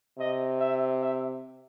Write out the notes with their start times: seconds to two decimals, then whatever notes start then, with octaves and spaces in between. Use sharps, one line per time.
0.19 C3 D#5
0.60 E5
1.01 E5